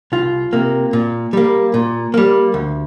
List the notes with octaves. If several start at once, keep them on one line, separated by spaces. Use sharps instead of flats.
C2 F4
C3 A#3
A#2
G3 A#3
A#2
G3 A#3
D2